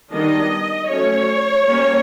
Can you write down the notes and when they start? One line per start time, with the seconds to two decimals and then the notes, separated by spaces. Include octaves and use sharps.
0.11 D#3 G3 B3 D4 D#5
0.87 F#3 A3 C#4 C#5
1.64 G3 A#3 C#4